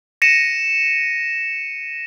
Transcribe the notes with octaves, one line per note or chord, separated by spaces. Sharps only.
A#6 C#7 D#7 E7